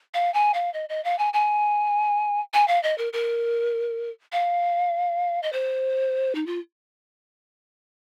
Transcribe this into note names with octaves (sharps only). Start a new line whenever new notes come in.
F5
G#5
F5
D#5
D#5
F5
G#5
G#5
G#5
F5
D#5
A#4
A#4
F5
D#5
C5
D#4
F4